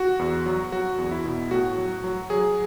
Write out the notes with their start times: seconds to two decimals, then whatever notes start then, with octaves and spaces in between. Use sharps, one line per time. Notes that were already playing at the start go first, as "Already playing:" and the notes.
Already playing: F#4
0.19 E2
0.46 F#3
0.72 F#3 F#4
0.98 E2
1.11 E4
1.25 B2
1.51 A2 F#4
1.78 F#3
2.04 F#3
2.30 F#3 G#4